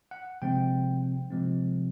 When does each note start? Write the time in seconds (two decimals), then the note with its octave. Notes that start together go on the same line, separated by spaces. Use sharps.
0.11 F#5
0.42 C3 F3 G#3 C4 G5
1.31 C3 F3 G#3 C4